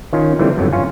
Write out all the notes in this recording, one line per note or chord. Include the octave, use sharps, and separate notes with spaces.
D#3 C#4 F4
D3 E3 F3 G3 A3 C4
G1 F2 D3 F#3
C#4 F4 C#5 F5 G#5